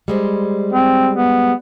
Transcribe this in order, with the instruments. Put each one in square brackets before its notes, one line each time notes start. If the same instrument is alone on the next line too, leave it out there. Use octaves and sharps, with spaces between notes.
[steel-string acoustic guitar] G3 G#3 C5
[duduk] C4
B3